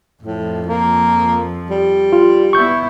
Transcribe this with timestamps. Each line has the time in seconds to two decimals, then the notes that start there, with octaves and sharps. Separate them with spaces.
0.23 F2 A2 F3
0.66 A#3
1.70 G3
2.13 F4
2.53 B3 E4 C#6 G6